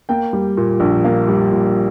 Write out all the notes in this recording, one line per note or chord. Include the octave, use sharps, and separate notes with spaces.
A#3 G5
G3
A#2
A#1
A#3 F5
G3
A#2